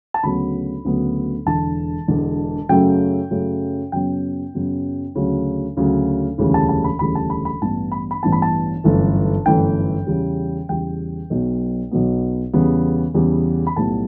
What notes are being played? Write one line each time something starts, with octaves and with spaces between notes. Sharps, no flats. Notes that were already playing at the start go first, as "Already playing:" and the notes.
A5
D2 C#3 F#3 B3 B5
D2 C#3 F#3 B3
E1 E2 D3 A5
E1 E2 D3
F#2 C#3 F#3 A3 G5
F#2 C#3 F#3 A3
F#2 C#3 F#3 B3 G5
F#2 C#3 F#3 B3
D2 C#3 F#3
D2 C#3 F#3
E1 D2 C#3 E3 G3
A5
A5
B5
E1 D2 C#3 E3 G3 B5
A5
B5
B5
A1 G2 E3 B3 A5
B5
B5
A1 G2 E3 B3 A5
B5
A5
G1 F#2 E3 A3
G1 F#2 E3 A3 G5
E2 C#3 G3
E2 C#3 G3 G5
B1 B2 F#3 B3
B1 B2 F#3 B3
E2 C#3 G3 B3
E2 C#3 G3 B3
B5
B1 A2 G3 B3 A5